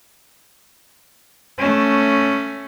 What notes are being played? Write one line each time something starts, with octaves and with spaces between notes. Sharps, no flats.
A3 C#4